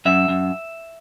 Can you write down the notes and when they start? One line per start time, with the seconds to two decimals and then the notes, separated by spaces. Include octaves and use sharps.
0.05 F#2 E5
0.28 F#2